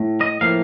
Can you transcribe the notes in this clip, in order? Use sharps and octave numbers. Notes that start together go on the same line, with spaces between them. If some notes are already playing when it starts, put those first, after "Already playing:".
Already playing: A2 A3
D#5
A2 F3 A#3 F5